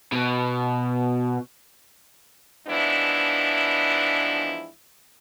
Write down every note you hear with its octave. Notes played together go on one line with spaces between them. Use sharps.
B2
G#2 E3 F3 B3 D4 E4